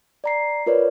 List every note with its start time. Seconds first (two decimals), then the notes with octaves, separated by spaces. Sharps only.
0.24 D5 A#5 C7
0.66 F4 A#4 B4 C#5 D5